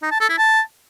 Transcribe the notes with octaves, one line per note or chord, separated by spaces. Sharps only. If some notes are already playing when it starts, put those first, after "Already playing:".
D#4
A5
A4
E4
A5